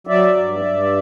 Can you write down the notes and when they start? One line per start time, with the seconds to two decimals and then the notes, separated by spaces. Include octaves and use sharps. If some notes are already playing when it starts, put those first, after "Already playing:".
0.07 F#3 D5 E5
0.37 G2
0.65 G2